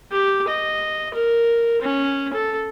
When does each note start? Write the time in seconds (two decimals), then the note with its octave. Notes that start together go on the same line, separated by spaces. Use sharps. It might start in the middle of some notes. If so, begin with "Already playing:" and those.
0.12 G4
0.48 D#5
1.14 A#4
1.82 C#4
2.33 A4